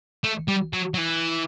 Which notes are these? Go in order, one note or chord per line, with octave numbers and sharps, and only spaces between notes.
A3
G3
F#3
F#3
E3